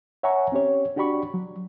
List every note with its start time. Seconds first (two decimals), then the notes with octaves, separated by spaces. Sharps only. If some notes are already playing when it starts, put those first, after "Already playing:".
0.23 C#5 E5 F#5 G#5 A#5 C#6
0.52 C4 C#4 G4 C#5
0.96 D4 F#4 G4 D5 B5 C#6
1.34 F#3